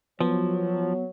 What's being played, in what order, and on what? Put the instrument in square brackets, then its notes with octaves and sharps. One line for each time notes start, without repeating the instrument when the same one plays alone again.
[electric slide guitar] F3 [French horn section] F#3 C#5 [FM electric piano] B3